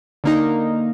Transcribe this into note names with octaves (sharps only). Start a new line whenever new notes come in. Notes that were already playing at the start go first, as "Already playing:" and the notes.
D3 A#3 D#4